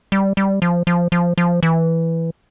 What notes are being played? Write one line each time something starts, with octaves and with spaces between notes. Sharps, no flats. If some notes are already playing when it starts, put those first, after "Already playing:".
G3
G3
F3
F3
F3
F3
E3